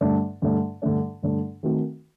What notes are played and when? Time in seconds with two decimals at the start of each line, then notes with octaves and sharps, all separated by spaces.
0.01 G2 D3 A3 D4
0.42 G2 D3 A3 D4
0.82 G2 D3 A3 D4
1.22 G2 D3 A3 D4
1.63 D#3 A3 C4 F#4